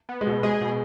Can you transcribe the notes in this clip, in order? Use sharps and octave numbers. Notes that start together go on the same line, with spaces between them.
B3
G#3
B2
G#3 G#4
B2